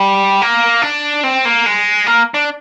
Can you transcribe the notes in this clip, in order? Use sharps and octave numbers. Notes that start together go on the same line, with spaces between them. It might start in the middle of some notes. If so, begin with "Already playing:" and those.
Already playing: G3
A#3
D4
C4
A#3
G#3
A#3
D4